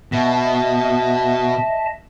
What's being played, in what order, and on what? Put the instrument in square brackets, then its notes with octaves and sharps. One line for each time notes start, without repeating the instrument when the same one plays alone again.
[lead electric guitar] B2 [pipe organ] D#5 E5 A5